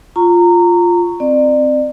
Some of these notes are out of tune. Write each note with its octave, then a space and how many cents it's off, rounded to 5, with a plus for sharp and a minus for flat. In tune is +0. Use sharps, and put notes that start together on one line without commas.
F4 +0 A#5 -20 C#6 +0
C4 +0 D5 +30